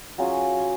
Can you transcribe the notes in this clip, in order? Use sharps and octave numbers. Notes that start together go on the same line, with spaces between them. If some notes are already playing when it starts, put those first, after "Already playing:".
F#3 C#4 F4 G#4